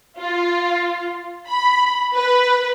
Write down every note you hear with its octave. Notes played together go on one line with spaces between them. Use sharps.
F4
B5
B4